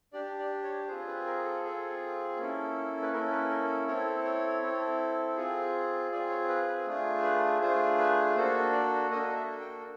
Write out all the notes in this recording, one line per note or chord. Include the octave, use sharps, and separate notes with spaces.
D4 G4 D5
D5
C#5
C4 F4 G#4 C5
B4
A#4
A4
C4 F4 G#4
A#3 C#4 E4 A4
B4
A#3 C#4 E4 A4 A#4
B4
A#4
C4 E4 A4 C#5
C#5
C4 E4 A4
C4 F4 G#4
C4 F4 G#4 D5
C#5
B4
B4
A3 D4 F4 G#4
B4
A3 D4 F4 G#4 C5
B4
A#3 D4 F#4 A4 C5
D5
A#3 D4 F#4 A4 D#5
E5
G5